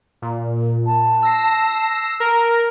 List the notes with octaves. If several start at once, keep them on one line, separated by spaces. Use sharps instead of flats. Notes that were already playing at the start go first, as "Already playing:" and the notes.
A#2
A5
E6 A#6 C7
A#4